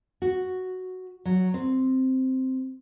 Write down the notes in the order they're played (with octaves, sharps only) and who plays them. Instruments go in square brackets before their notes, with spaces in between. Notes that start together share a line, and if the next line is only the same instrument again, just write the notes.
[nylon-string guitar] F#4
F#3
C4